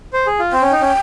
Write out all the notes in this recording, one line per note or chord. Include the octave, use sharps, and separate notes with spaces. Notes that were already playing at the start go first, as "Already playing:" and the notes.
C5
G#4
F4
C4 G5
C#4
D#4
C#4